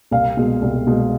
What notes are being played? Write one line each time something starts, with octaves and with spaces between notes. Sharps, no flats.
C2 F5
B2 G#3
C2
B2 G#3